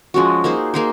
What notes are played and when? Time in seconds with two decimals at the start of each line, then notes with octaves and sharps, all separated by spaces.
0.14 F3 G#3 C#4 F#4
0.44 A#3 D#4 G#4 C5
0.74 A#3 D#4 G#4 C5